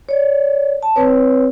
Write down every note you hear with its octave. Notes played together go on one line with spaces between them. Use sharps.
C#5 D5
A5
C4 B4 C#5